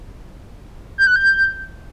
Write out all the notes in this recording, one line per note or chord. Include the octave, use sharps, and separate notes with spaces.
G6
F#6
G6